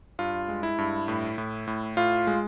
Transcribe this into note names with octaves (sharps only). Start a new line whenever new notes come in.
G2 F4
G#3
E4
G2
A2
A2
A2
A2 F4
G#3